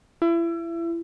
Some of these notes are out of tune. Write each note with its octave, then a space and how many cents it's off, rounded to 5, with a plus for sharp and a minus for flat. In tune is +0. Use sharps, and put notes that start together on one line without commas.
E4 +30